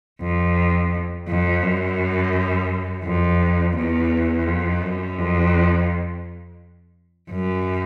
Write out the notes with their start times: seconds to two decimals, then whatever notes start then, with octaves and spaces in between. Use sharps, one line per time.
0.21 F2
1.28 F2
1.63 F#2
3.04 F2
3.77 E2
4.47 F2
4.82 F#2
5.18 F2
7.30 F#2